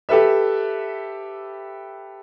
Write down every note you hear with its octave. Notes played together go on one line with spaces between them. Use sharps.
G4 A4 B4 E5